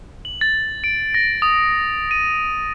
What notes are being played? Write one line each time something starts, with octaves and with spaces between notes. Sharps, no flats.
F#7
A6
D7
A#6
D#6
D#7